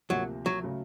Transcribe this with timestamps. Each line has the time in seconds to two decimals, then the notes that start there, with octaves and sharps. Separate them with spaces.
0.10 D2 C3 F3 F#3 A#3
0.46 F#3
0.63 C#3 F#3 A3